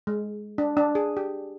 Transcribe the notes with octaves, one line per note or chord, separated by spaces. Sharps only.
G#3
D4
D4
G#4
G4